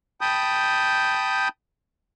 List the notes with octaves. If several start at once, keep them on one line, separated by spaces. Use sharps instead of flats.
G5 A5 B5 D#6 G6